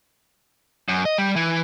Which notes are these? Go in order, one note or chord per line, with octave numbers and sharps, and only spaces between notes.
F#2
D#5
G3
E3